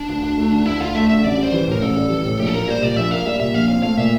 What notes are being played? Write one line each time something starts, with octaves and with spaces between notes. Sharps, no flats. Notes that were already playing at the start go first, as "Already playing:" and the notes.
Already playing: D4
D2
D2
A3
D3
D2 E4
D2 F4
A3 E5
D3 E5
A1 D5
G3 C5
E3
A2 A#4
A1 A4
G3
E3
A2
A#1 G4
A4
A#3 A#4
G3 C5
A#2 D5
A#1 E5
A#3 F5
G3 E5
A#2 E5
A#1 F5
C4 F5
A3 F5
A#2 E5